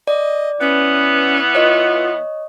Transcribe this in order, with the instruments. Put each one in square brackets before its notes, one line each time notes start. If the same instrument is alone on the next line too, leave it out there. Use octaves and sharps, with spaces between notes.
[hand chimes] D5 [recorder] D#5
[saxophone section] E3 B3 [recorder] C#4
[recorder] F4 [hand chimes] C#5 D#5